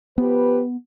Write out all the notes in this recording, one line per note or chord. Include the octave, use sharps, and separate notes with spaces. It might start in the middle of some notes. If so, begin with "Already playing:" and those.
F3 B3 G4 B4